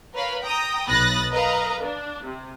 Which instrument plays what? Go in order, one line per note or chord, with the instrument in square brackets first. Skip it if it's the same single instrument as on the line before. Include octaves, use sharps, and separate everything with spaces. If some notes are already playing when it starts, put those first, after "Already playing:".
[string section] A#4 B4 C#5 F5 B5
G5 A#5 D#6
B1 B5 D#6 F#6 A6 A#6
A#4 B4 D#5 F5 A#5
D4
C3